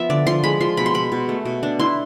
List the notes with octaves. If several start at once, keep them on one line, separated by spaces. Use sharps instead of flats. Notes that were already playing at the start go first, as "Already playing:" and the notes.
Already playing: F3 B3 E5
D3 D5
F3 C6
G#3 B5
F3 C6
B2 B5
C6
B2 B5
B2
A3
B2
D4
E4 C6